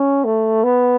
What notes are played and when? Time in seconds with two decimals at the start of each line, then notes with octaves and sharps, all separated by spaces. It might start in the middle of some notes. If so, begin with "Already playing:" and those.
Already playing: C#4
0.24 A3
0.64 B3